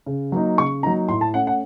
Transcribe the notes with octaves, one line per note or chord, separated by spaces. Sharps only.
C#3
F#3 A#3 D#4
C#3 C#6
F#3 A#3 D#4 A#5
A2 C6
A5
A3 C#4 F#5
F#5